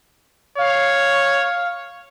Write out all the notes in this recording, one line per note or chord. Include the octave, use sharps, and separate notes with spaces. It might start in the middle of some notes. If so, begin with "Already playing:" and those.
C#5 F5